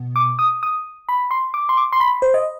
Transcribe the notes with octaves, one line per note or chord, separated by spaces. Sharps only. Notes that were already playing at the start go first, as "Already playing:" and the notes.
Already playing: B2 B3
D6
D#6
D#6
B5
C6
D6
C6
D6
C6
B5
C5
D#5